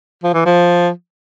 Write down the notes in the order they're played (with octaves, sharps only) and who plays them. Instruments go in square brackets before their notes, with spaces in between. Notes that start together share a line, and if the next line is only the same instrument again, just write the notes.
[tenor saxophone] F3
E3
F3